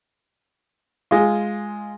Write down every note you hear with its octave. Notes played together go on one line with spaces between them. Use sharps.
G#3 F4